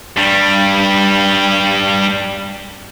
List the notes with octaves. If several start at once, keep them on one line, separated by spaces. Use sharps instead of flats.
G2 G3